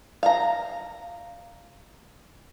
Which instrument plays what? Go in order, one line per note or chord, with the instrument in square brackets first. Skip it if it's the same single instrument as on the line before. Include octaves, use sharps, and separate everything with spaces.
[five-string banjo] F5 A#5